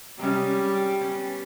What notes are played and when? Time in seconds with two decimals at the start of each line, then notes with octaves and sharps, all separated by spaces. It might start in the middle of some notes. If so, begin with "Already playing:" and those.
0.19 C3 G3 G#3 C#4
1.01 B3 C#4